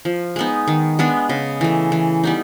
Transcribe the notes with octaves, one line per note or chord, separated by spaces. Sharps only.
F3
G#3 B3 D#4
D#3
G#3 B3 D4
C#3
E3 A3
E3
G3 B3 D#4